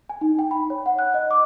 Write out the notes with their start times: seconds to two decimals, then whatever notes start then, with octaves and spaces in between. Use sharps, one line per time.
0.09 G#5
0.21 D#4
0.39 G5
0.51 B5
0.70 C#5
0.86 F#5
0.99 F#6
1.14 D#5
1.31 D6